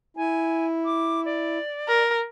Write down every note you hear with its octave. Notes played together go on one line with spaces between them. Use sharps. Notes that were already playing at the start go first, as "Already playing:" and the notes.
E4 G#5
D6
D5
A#4